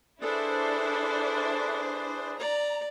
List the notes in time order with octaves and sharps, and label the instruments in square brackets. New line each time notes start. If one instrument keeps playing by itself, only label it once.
[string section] D4 E4 C5 [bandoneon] G#4 B4 D5 [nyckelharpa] A4
[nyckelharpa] D5 [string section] A#5